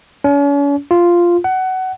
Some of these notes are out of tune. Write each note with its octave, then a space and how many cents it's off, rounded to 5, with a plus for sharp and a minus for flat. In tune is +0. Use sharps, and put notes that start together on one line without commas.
C#4 +40
F4 -5
F#5 +20